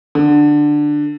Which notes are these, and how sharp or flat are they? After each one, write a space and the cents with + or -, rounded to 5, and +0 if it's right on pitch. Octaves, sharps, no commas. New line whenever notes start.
D3 +10